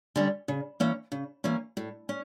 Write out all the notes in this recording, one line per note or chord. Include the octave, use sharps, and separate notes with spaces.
D3 G3 C#4
C#3
E3 A#3 C#4
C#3
E3 A#3 C#4
A2
C#4